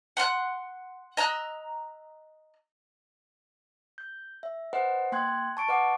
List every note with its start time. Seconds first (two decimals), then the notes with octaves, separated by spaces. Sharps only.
0.17 F#5 C6 F6 F#6
1.17 D#5 A#5 E6 F#6
3.98 G6
4.43 E5
4.73 B4 C5 D#5 F#5
5.12 A#3 G5 C6 F#6 G#6
5.57 A5 C#6 D7
5.68 B4 D#5 F#5 D6